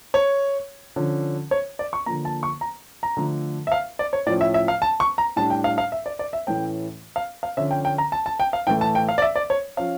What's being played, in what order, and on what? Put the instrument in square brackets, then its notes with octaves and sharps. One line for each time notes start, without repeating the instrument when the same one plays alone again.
[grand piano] C#5
D3 F3 C#4
C#5
D5
C#6
D3 F3 A#3 A#5
A5
C#6
A#5
A#5
D3 F3 A3
E5
F5
D5
C#5
A2 F3 C#4 D5
E5
E5
F5
A5
C#6
A#5
A2 G3 D4 A5
G5
F5
F5
E5
D5
D5
E5
A2 E3 A3 C#4 G5
F5
F5
D3 F3 C#4 E5
G5
G5
A#5
A5
A5
G5
F5
A2 E3 A3 G5
A5
G5
F5
D5
E5
D5
C#5
F3 C#4 F5